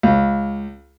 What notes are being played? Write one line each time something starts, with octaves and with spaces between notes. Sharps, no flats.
C#2